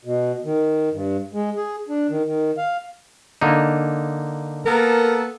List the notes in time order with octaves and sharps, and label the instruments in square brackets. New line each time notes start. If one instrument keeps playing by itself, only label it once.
[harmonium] B2
D#3
G2
G#3
G#4
D4
D#3
D#3
F5
[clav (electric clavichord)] D3 A#3 D#4
[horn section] A#3 B3 A4 [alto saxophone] A#4